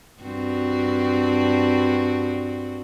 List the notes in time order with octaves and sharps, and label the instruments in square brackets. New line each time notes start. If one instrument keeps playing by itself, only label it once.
[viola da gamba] G2 C4 F#4